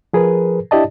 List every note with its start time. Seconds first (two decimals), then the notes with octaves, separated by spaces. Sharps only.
0.13 F3 G#4 A#4 B4
0.71 D4 E4 G4 D5 D#5 A5